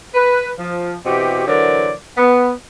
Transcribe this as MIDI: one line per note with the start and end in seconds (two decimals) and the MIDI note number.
0.15 0.50 71
0.59 0.95 53
1.06 1.45 47
1.06 1.45 52
1.06 1.45 60
1.06 1.45 66
1.06 1.45 67
1.47 1.93 50
1.47 1.93 52
1.47 1.93 54
1.47 1.93 70
1.47 1.93 72
1.47 1.93 74
2.18 2.51 59